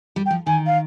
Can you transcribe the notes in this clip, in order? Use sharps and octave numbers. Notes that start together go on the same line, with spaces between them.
G3
G5
F3
D#3 G#5
F5